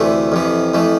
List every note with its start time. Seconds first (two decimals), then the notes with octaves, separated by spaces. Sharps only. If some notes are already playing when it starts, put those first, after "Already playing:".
Already playing: D2 C3 E3 A3
0.32 F2 C3 E3
0.74 F2 E3 A3